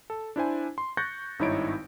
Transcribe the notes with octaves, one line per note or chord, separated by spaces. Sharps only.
A4
D4 E4 C5 G#5
C6
C#6 F#6 G6 A6 A#6 C#7
G#1 G2 D#4 E4 C#5 D7